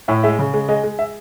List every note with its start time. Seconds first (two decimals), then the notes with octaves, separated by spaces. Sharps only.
0.08 A2 E5
0.23 G#3 E5
0.39 C#3
0.54 G#3
0.69 G#3 D#5
0.84 G#3
0.99 E5